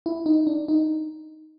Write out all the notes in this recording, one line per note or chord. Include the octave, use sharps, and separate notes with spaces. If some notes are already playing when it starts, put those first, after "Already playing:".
E4
D#4
D4
D#4